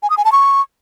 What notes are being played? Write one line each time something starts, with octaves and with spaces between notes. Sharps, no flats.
G#5
D#6
G#5
A5
C#6